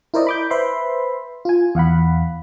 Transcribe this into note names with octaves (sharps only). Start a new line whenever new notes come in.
E4 A#4 C5 D5 D#5
B5 D6 G6
B4 C5 E5 B5 C6
F4 G#5
E2 F5 F#5 B5